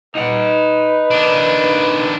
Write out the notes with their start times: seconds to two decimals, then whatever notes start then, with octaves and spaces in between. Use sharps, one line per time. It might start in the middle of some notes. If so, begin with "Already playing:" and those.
0.15 D#4 B4 F#5
1.11 D#3 D4